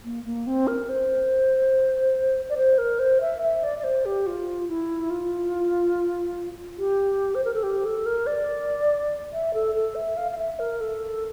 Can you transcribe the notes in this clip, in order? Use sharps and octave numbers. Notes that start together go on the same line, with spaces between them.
A#3
A#3
C4
A#4
C5
D5
C5
A#4
C5
E5
E5
D5
D5
C5
G4
F4
E4
F4
G4
C5
A#4
A4
G4
A4
A#4
D5
E5
A4
A4
E5
F5
F5
E5
A#4
A4